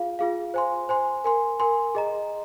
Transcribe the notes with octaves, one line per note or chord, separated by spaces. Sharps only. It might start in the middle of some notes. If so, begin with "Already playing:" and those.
Already playing: F4 G#4 F5
F4 G#4 F5
C5 G#5 C6
C5 G#5 C6
A#4 G#5 C6
A#4 G#5 C6
G#4 D#5 A#5